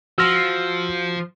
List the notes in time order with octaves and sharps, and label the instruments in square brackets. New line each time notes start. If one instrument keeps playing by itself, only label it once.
[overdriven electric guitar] F3 [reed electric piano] F#4 C6 [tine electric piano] E6 F6 A#6